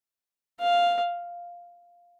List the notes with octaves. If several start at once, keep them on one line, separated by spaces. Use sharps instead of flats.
F5